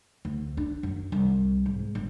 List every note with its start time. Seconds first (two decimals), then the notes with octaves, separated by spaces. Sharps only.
0.25 D2
0.57 D4
0.83 F#2
1.12 C2
1.66 G#2
1.95 G1